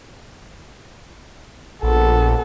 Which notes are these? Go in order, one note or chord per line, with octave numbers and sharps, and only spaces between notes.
A#1 B3 A4